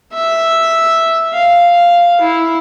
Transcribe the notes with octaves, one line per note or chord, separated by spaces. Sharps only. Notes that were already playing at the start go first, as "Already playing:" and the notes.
E5
F5
E4